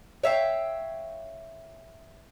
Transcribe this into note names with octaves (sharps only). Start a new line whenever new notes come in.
C#5 E5 F5 G5